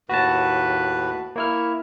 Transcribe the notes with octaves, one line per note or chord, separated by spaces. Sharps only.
D#2 A2 F#4 B4 A5
A#3 E4 C#5 F6